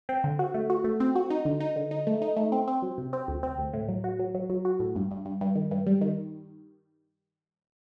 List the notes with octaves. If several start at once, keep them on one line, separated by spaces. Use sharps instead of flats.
C4
D3
F#4
A3
F#4
A3
C4
F#4
D#4
D3
D#4
D3
D#4
A3
D#4
A3
C4
C4
F#3
C3
C4
D2
C4
D2
A2
F#3
F#4
F#3
F#3
F#3
F#4
A2
G2
G2
G2
G2
D#3
G2
G3
D#3